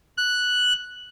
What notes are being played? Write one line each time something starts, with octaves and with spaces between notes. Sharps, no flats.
F#6